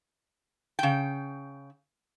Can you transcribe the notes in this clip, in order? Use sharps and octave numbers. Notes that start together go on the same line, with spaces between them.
C#3 G5